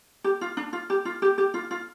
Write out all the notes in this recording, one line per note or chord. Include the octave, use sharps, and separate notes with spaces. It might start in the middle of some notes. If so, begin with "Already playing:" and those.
G4
F4
D4
F4
G4
F4
G4
G4
F4
F4